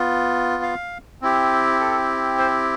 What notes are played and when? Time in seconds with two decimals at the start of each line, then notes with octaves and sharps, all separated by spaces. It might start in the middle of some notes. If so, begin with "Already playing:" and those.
Already playing: B3 F4
0.63 F5
1.21 C4 E4 G4
1.80 A4
2.38 C5